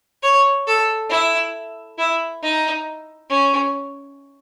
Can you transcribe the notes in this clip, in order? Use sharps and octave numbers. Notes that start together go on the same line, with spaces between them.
C#5
A4
E4
E4
D#4
C#4